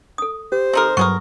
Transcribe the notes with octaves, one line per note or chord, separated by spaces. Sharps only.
A4 D#6
G4 C5
C4 D#4 A4 A#4 C6
G2 F#3 B3 G#4 A#4 C#6 D#6